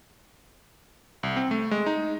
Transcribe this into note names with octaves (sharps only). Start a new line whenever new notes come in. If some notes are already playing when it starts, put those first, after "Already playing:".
C2
C4
A3
G#3
D#4